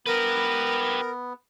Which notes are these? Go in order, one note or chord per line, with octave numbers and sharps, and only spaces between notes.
B3 G4 A#4 B4